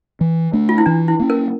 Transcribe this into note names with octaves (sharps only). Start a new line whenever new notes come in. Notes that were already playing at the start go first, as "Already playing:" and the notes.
E3
A3 D4
F4
E4
E3 D4
E4
A#3 C#4
A#4